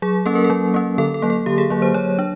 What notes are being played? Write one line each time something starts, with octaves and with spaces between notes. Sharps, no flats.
F#3 G#4
A#3 C#4 A4
A#4
A4
F#3
A#3 C#4
D3 A4
A4
F#3 A#3
A4
D3 G4
G#4
F#3 A#3
C5
F#3 C#5
D4